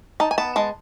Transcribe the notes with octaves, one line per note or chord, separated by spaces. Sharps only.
D#4 A5
G#5
B3 A5
G#3 A5